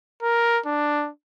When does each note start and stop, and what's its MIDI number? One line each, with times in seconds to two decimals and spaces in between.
0.23 0.60 70
0.66 1.09 62